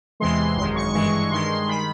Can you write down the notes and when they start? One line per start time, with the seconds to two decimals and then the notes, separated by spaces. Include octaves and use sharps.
0.20 E2 C3 E3 G#3 C6
0.57 G#1 F#2 D#3 G#3 C6
0.76 C#6
0.94 G2 E3 G#3 C#6
1.31 G2 D#3 G#3 C6
1.68 D#3 B5